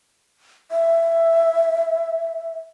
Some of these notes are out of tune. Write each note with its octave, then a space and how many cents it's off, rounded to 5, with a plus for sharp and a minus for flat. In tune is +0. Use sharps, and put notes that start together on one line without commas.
E5 +10